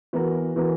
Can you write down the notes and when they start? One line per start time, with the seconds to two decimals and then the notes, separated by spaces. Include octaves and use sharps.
0.13 E3 B3 F#4 A#4
0.56 E3 B3 F#4 A#4